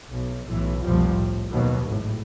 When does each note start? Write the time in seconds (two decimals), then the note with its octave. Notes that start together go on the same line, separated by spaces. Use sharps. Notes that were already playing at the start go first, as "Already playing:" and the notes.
0.11 B1
0.47 B1 A2 E3
0.85 F1 C2 B2 F3 G3
1.14 A2
1.51 D#2 B2 F#3
1.88 G#1 A2